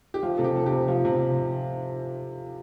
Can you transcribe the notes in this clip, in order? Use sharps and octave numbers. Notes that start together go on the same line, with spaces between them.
G4
F3 F4
C3 A4
G4
F3 A4
G4
C3
F3 F4
C3